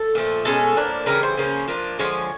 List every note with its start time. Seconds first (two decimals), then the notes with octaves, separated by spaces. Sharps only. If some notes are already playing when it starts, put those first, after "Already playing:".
Already playing: A4
0.15 A#2 F3 A3
0.45 B2 G#3 C#4 A4
0.76 A2 F3 A#3 D4
1.06 C#3 E3 G3 A#4
1.23 C5
1.37 C#3 F3 A#3 C#4
1.68 F3 A#3 D4 F4
1.99 D3 F3 G#3 C#5